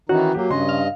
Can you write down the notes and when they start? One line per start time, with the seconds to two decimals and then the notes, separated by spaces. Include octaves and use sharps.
0.09 D#3 E3 C#4 D#4 F#4
0.34 F#3 A#3 G4
0.50 G2 C#3 C#4 D#5 C6
0.69 F5